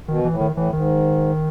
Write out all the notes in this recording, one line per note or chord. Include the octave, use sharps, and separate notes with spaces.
B2 D#3
A2 E3
D#3
A2
E3
G#2 D#3